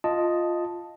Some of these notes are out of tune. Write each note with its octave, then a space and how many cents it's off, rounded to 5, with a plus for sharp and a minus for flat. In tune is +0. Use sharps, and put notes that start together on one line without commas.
F4 +0 D#5 +0 A5 +0